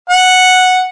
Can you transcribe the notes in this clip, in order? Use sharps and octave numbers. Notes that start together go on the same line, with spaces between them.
F#5